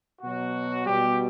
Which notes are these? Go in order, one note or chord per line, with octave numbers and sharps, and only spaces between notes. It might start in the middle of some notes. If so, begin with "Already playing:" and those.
B2 F#3 F#4
B2 G3 G4